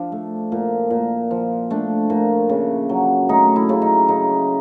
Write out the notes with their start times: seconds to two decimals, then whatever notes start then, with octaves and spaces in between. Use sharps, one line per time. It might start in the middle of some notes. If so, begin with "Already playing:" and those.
Already playing: F3 D4
0.12 A3
0.52 A#2
0.90 A#2
1.31 F3
1.71 A3 D4
2.10 A#2
2.49 C#3
2.89 F#3
3.29 A3 D#4
3.56 E4
3.69 C#3
3.82 D#4
4.08 C#3 D#4